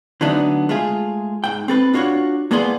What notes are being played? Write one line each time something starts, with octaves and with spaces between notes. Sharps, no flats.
D3 F#3 A3 B3 D4 D#4
G#3 A3 F4 G#4
G#2 G5
C4 A4 B4
D4 F4 F#4 C5 C#5
A2 A#3 B3 G#4 D5 C6